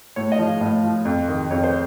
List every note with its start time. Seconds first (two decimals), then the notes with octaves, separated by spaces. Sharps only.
0.16 A2 C#5
0.32 D#5
0.39 F3
0.47 F5
0.61 A2 D#5
0.83 F3
1.05 F2
1.28 D#3
1.51 F2 C#5
1.64 C5